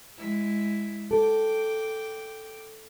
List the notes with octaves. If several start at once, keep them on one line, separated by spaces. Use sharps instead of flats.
G#3 E4
A4 G5 D6